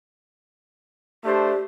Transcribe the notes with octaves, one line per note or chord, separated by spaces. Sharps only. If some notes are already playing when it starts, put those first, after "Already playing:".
A3 D4 G4 C5